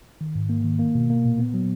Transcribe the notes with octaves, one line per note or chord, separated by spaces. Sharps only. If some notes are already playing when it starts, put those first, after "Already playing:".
D#3
G#2
A#3
D#3
A#3
B2
A#3
A#2
B3
F#3